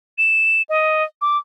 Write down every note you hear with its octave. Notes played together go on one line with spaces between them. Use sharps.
E7
D#5
D6